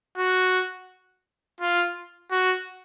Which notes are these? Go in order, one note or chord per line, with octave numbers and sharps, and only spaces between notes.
F#4
F4
F#4